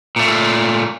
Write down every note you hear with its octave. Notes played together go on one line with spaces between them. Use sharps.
A#2 A3